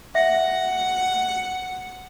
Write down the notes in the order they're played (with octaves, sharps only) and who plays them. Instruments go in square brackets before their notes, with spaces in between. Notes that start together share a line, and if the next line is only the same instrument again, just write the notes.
[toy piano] E5 [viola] F#5